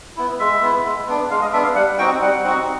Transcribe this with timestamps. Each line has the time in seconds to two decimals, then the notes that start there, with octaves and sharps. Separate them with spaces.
0.17 B3 E4
0.39 G#3 E5
0.61 B3 E4
0.85 G#3
1.07 B3 D4
1.30 G#3 F5
1.42 D#5
1.53 B3 D4 E5
1.64 F5
1.75 G3 F#5
1.98 C4 D#4 F#4 G5
2.21 G3 F#5
2.43 C4 D#4 F#4